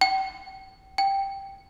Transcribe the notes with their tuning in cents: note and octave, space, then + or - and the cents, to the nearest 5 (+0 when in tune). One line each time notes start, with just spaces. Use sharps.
G5 -35
G5 +0